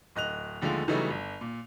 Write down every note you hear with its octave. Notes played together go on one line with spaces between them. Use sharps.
D1 D#5 F#6 F7
D#2 D3 F3 G#3 A3 F7
C#3 E3 F#3 G3 A3 D#4
G1
A#2